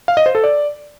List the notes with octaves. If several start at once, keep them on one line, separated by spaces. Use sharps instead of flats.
F5
D#5
C5
A4
D5